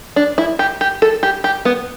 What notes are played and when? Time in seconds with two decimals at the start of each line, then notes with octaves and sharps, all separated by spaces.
0.16 D4
0.38 E4
0.59 G4
0.81 G4
1.02 A4
1.23 G4
1.44 G4
1.65 B3